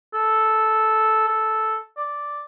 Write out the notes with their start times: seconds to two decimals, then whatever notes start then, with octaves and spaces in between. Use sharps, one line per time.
0.14 A4
1.28 A4
1.97 D5